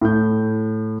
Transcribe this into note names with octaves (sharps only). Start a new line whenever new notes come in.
A2 G6